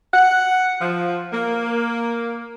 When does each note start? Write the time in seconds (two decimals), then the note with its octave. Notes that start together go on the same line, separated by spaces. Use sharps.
0.14 F#5
0.80 F3
1.33 A#3